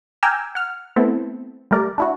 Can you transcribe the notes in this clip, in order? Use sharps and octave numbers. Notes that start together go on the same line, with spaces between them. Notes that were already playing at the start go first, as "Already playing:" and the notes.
G5 G#5 A#5 D6 E6 F6
F#5 F6
A3 B3 C4 E4 A4
G3 A3 A#4 D5
D4 E4 F#4